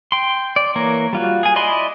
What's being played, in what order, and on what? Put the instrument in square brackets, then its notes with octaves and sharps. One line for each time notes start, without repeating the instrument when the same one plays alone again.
[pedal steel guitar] G5 C6
D5
E3 A#3 A#4 C#5
G3 F4 F#4
G#4 G#5
E4 D5 D#5 B5 C6